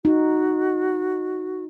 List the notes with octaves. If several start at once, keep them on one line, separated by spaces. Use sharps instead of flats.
D#4 F#4